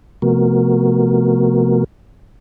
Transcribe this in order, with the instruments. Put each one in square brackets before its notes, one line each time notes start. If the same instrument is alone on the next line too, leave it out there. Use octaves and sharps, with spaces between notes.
[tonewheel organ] C3 F3 A3 B3 F#4 A#4